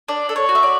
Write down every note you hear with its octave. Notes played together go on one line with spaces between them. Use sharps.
D4 D5
A4
C#5
F#4
E5
D5